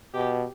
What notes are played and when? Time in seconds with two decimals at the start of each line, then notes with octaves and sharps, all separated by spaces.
0.14 B2 G4